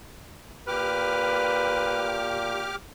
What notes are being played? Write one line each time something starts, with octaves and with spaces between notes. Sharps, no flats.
A#2 G4 B4 D6 F6